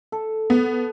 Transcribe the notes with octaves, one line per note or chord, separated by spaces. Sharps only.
A4
B3